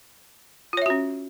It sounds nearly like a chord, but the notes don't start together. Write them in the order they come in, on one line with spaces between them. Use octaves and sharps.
F4 C#5 E5 F#4 C#4